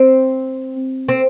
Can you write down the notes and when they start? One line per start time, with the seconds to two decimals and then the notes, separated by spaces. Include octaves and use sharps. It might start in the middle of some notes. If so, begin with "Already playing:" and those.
Already playing: C4
1.09 C4